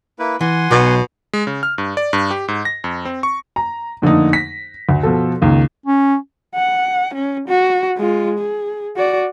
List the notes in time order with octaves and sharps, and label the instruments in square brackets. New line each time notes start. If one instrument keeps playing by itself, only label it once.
[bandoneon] A#3 E4 B4
[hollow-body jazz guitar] E3 [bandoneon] F#5 G#5 C6
[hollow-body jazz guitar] B1 [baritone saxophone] B2
[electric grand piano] G#3
C#3
F6
G2
D5
G2
G4
G#2
A#6
F2
C4
C#6
[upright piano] A#5
F2 D3 A3 A#3 D#4
A#6 B6
D2
B2 F3 A4
C#2 D#3 A#3
[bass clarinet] C#4
[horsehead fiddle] F#5
C#4
F#4
G#3 F4
G#4
F#4 D5